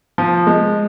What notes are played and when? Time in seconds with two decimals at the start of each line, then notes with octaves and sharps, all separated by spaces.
0.18 F3
0.47 G#3